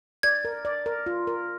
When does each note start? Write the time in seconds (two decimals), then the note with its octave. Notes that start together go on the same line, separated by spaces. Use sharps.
0.23 D5 G#6
0.45 A#4
0.65 D5
0.86 A#4
1.06 F4
1.27 A#4